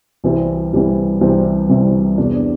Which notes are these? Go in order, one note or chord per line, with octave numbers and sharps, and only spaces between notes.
C2 C3 E3 G3 C4
C2 C3 E3 G3 C4
C2 C3 E3 G3 C4
C2 C3 E3 G3 C4
E2 C3 G3 D4